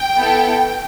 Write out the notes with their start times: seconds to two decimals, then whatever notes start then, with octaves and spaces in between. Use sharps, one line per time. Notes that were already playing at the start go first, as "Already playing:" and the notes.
Already playing: G5
0.18 B3 E4 A4